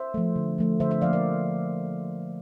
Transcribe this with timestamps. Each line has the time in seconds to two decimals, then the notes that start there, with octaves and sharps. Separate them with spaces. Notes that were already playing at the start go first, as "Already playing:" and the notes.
Already playing: C5 E5
0.14 F3 A3
0.36 D3
0.58 F3 A3
0.80 D3 C5 E5
0.91 C5 E5
1.01 F3 A#3 D5 F5
1.13 A#4 D5